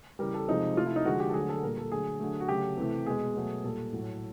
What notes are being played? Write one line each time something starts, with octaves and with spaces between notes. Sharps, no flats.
C#3 E3 G3 A#4
A4
C3 F3 G#3 D#4
C3 F3 A3 F4
E4
D#4
D3 F3 G#3 F#4
G4
A4
D3 F#3 A3 G#4
A4
A#2 G3 A#4
A4
D3 F#3 A3 G#4
D3 F#3 A3
F#4
C#3 F#3 A3 G4
C3 E3 A3
B2 G#3 G#4
B2 F#3 A3
A#2 G3 A4
A2 F#3 A3